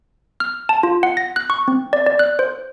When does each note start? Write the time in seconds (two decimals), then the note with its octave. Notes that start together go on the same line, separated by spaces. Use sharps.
0.40 F6
0.69 A5
0.83 F4
1.03 F#5
1.17 A#6
1.36 F#6
1.50 C#6
1.68 C4
1.93 D5
2.06 D5
2.19 F#6
2.39 C5